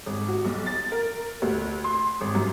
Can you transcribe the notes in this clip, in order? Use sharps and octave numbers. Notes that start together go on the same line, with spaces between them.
G#1
F#4
B1
A6
A#4
D2
C6
G#1
F#2